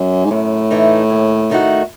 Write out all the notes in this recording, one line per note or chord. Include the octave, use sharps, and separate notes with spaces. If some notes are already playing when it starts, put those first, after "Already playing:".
Already playing: F#2
G#2
F#2 A2
E3 A3 D#4
D#2
D#3 A3 D#4 F#4